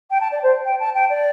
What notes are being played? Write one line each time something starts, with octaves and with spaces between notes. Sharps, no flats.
G5
A5
D5
C5
G5
A5
G5
D5